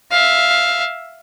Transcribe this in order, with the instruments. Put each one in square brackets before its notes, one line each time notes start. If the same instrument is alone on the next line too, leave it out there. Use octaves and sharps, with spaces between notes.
[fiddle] E5 F5